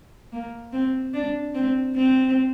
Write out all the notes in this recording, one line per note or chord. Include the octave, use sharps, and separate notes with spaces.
A#3
C4
D4
C4
C4